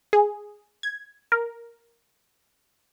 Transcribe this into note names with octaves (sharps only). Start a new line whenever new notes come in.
G#4
G#6
A#4